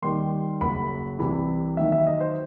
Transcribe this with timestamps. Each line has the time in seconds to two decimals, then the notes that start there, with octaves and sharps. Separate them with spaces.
0.02 D#2 D#3 G3 C6
0.61 F#1 F#2 F#3 B5
1.19 C2 C3 E3 B5
1.77 D#2 D#3 F#3 E5
1.92 E5
2.07 D#5
2.20 C5